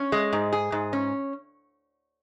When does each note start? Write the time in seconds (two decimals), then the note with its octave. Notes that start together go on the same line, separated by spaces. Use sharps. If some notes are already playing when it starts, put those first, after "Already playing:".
Already playing: C#4
0.12 G#3
0.33 G#2
0.53 G#4
0.72 G#2
0.93 C#4